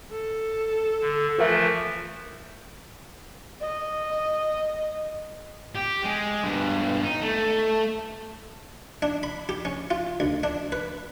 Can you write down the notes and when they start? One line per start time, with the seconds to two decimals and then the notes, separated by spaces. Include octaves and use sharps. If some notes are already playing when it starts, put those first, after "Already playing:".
0.11 A4
1.01 D3
1.38 E3 F3 A3 F4 A#4 E5
3.61 D#5
5.75 G4
6.04 G#3
6.44 G2 B2
7.02 D#4
7.22 A3
9.02 D4
9.23 B5
9.49 G4
9.65 C#4
9.91 F4
10.20 D2
10.43 D4
10.72 B4